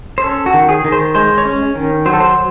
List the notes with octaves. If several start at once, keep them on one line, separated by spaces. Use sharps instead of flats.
C5
C#4 A4
F#4
D#3
G#4
D#3
C5
G#3 C5
C#5
C#4
D#3
F#3 C5
A4
C5